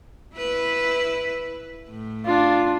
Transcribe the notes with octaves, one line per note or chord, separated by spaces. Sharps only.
E4 B4
A2
D4 F4